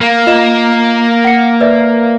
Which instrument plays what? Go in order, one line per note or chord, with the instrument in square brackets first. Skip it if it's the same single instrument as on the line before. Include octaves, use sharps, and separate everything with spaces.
[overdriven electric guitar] A#3
[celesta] F4 D#5 E7
F#5 C#7
B4 D5 E5